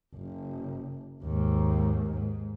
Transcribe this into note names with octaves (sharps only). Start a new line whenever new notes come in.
F#1
D#2 G#2
G#2